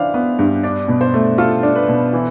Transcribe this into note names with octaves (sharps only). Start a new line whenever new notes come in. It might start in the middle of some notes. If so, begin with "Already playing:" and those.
Already playing: E3 D4 C5 F5
B3
G2
D4 D5
B2
C5
A3
F4 A4
D4
B4
B2
E3